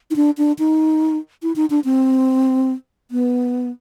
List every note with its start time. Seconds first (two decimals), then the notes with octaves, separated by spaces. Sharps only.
0.11 D#4
0.16 D4
0.38 D4
0.59 D#4
1.43 E4
1.56 D#4
1.70 D4
1.85 C4
3.11 B3